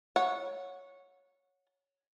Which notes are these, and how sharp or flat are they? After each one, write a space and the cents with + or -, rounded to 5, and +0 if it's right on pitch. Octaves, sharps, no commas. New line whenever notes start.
C#5 +0 F#5 -20